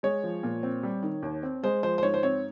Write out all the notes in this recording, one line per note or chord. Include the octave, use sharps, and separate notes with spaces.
G#3 C#5
F3
A#2
C4
G3
D#3
D#2
C4
G#3 C5
F3 C5
C5
G#2 C#5
C5
C4 C#5